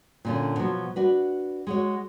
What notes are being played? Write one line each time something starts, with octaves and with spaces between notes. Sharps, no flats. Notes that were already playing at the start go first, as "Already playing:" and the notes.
A#2 D3 C#4
B2 F3 F#3
D4 F#4 B4
G#3 F#4 C#5